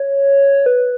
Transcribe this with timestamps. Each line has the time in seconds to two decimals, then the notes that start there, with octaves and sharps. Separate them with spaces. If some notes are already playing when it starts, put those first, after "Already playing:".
Already playing: C#5
0.66 B4